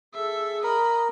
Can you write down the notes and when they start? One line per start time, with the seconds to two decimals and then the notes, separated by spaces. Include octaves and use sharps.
0.14 G#4 A4 E5
0.64 A#4 D#5 B5